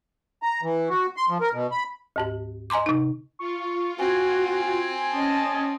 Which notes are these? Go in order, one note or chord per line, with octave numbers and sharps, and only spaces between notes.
A#5
E3
F#4
C6
F3
A#4
B2
B5
D2 G#2 G4
D#5 G#5 A#5 C6 D6
C3 D#4
F4 C#6
C4 F#4 G#5
C#4 D#5 A5